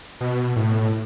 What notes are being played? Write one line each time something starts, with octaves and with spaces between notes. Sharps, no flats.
B2
A2